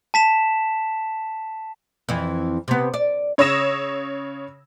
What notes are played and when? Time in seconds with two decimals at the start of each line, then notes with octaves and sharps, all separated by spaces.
0.14 A5 B6 E7
2.09 F2 E3
2.68 C3 B3
2.94 D5
3.38 C#3 C#5 D#6 E6 A#6 E7